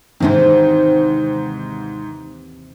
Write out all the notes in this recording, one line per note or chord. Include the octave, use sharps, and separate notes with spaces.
D#2 G#2 C3 D#3 E3